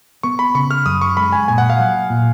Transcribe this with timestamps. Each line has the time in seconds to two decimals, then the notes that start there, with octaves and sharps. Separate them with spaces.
0.23 B3 C#6
0.39 B5
0.55 C#3 C#6
0.71 F6
0.86 F#2 D#6
1.01 C#6
1.17 G#3 B5
1.32 G#5
1.48 A#2 G#5
1.58 F#5
1.70 F5
1.79 F#3 F#5
2.10 A#2